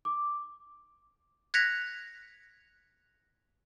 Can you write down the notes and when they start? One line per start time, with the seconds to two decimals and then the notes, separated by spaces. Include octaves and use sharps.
0.05 D6
1.54 F#6 G#6 A#6 B6 C#7 F7